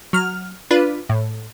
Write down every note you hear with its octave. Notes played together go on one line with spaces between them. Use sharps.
F#3 F6
D4 F4 B4
A2